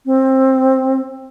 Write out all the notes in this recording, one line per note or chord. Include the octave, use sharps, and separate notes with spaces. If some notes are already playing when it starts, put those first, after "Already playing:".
C4